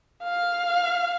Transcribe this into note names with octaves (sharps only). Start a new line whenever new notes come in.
F5